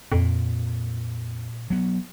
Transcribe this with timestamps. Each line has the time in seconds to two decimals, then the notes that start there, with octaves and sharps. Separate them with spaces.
0.12 F2 A#2
1.70 F#3 B3